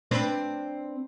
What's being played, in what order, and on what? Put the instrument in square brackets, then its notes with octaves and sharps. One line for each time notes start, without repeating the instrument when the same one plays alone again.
[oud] C4 D4 B4